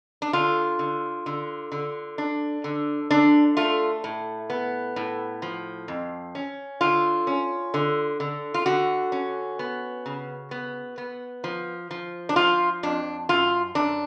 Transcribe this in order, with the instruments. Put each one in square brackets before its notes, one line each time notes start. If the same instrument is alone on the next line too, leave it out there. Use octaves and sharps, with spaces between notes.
[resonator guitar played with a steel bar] D4
D3 F4
D3
D3
D3
D4
D3
D3 D4
A3 F4
A2
B3
A2
F3
F2
C#4
D3 F4
C#4
D3
D3
F4
D3 F#4
C#4
B3
C#3
B3
B3
F3
F3
D4
F3 F4
F2 D4
F#2 F4
F#2 D4